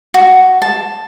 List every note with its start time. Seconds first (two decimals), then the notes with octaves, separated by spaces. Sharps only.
0.14 F#4
0.62 A5